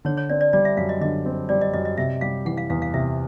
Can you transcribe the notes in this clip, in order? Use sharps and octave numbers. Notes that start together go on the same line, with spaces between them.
D3 C#5
C#5
C4 D5
D5
G3 D5
E5
F#2 F5
D#5
D3 D#5
C4
G3 D5
D#5
F#2 D#5
D#5
C3 E5
G3 F5
E3 F#5
F5
E2 F5
F5
C3 E5